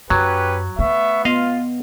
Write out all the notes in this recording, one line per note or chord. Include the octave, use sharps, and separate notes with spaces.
F#2 F#3 C#4 G4 B4
A3 B3 E5 C#6
B3 F4 D#5 F5